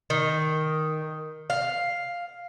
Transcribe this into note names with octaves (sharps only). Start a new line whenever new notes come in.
D#3
F5